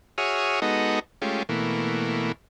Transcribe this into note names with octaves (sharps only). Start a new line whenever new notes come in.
F#4 G#4 C#5 E5 D#6 F6
G#3 B3 D#4 F#4 A4 D#5
G#3 A3 C#4 F4 G4
B2 E3 A3 A#3